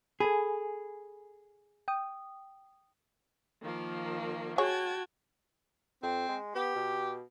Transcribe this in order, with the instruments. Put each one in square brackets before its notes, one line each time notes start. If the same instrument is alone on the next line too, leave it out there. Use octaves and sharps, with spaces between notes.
[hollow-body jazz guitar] G#4 [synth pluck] A4 G#5 B5
[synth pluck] G5 D#6
[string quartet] D#3 F3 A#3
[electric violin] F#4 [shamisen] G#4 C#5 [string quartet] G5 A5 G#6
[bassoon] F2 [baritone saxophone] C4
[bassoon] G#3
[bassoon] B3 [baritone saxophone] G4
[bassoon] B2